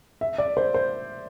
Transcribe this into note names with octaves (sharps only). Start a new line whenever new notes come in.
E5
D5
C5
C5